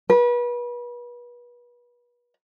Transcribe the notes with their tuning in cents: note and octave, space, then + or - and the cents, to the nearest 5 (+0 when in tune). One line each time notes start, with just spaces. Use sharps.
B4 -35